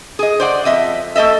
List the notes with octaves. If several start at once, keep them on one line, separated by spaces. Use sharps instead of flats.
G#4 D#5
C5 D5 F#5
F2 D#5 E5
A3 A4 D#5 E5